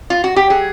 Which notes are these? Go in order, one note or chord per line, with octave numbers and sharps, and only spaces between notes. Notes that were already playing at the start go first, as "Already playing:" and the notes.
F4
F#4
G4
F#3 G#4